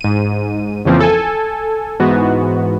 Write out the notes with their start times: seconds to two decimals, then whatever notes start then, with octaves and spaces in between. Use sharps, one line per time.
0.01 G#2 D#7
0.85 F2 C#3 E3 F3 A#3 C4
1.00 A4 G#5
2.00 G#2 E3 B3 F#4